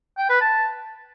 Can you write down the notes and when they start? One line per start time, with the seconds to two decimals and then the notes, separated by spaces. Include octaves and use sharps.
0.18 G5
0.29 B4
0.41 A5